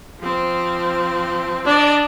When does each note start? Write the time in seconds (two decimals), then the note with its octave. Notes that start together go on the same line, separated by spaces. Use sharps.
0.19 F3 C4
1.66 D4 D5 D#5